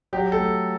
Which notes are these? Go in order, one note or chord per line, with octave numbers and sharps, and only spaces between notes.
F#3 G4
A4
A3